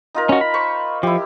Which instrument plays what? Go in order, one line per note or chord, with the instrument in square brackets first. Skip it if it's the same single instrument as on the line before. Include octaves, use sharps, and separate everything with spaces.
[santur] D#4 F4 A#4
[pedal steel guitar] C#4 F#4
B5
[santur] C5 C#6
[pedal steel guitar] F3 [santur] E4 G4